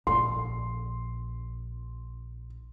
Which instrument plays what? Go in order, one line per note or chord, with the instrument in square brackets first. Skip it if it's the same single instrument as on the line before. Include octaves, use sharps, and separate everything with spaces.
[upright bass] A#1 [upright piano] C6